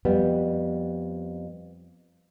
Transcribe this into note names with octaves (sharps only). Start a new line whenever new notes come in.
F2 G3 B3